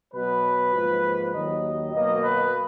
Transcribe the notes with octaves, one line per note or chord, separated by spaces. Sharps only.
B2 F#3 B3 B4
G#2 F3 A#3
D#2 D#3 F#3 D#5
B2 F#3 A#3 D#5
B4